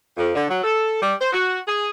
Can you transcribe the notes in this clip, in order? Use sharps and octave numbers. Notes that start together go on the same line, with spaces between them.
F2
D3
F#3
A4
G3
C5
F#4
G#4